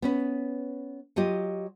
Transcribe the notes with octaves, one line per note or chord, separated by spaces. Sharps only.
B3 C#4 B4
F#3 F4 G4 D#5